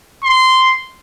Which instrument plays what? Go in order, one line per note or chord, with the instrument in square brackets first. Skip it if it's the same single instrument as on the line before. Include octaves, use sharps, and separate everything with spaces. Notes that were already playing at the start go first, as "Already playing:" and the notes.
[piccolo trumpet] C6